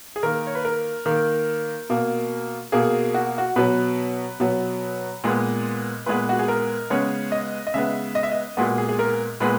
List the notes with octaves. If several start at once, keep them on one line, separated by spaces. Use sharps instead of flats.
G#4
D#3 A#3 A#4
C#5
B4
A#4
D#3 A#3
B2 A#3
B2 A#3 G#4
F#4
F#4
B2 F#3 B3 B4
B2 F#3 B3
A#2 G#3 B3
A#2 G#3 B3 B4
F#4
G#4
A#4
C#3 G#3 B3 C#5
D#5
D#5
C#3 G#3 B3 E5
D#5
E5
D#5
A#2 G#3 B3 F#4
G#4
G#4
A#4
A#2 G#3 B3 B4